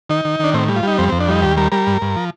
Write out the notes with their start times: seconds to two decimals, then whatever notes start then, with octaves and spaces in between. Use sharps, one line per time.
0.09 D#3 D#4
0.25 D#3
0.40 D#3 D4
0.54 A2 C4
0.68 G3
0.76 F4
0.83 G3 D#4
0.98 F2 C4
1.09 F2 C4
1.20 D4
1.28 G3 D#4
1.42 D#2 G4
1.57 G3 A#4
1.72 G3 A#4
1.87 G2
2.02 G2
2.16 F3